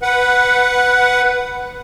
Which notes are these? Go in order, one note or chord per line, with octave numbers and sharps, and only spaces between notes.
B4 F#5